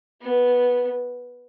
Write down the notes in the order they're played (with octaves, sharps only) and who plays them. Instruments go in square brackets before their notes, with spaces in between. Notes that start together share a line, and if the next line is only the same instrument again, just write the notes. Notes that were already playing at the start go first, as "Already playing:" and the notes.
[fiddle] B3